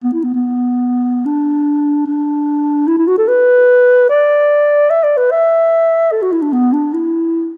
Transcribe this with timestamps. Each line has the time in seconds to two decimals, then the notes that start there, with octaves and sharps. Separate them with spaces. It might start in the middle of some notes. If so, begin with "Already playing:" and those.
0.04 B3
0.13 E4
0.23 B3
0.34 B3
1.25 D4
2.06 D4
2.87 E4
2.98 E4
3.07 F#4
3.18 A4
3.28 B4
4.09 D5
4.90 E5
5.03 D5
5.17 B4
5.31 E5
6.12 A4
6.22 F#4
6.32 E4
6.42 D4
6.52 B3
6.73 D4
6.93 E4